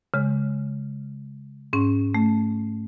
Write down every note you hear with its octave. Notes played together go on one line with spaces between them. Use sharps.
C#3 G#3
G#2 C#4
A3